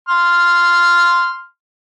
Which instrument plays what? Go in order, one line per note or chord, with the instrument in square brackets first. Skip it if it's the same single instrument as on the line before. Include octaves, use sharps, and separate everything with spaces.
[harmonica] C6 F6